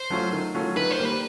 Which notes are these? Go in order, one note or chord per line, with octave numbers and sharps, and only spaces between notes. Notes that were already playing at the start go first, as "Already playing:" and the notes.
Already playing: C5
F#3 A3 C#4 F4
D#3
F#3 A3 C#4 F4
D#3 B4
C5
G3 A#3
B4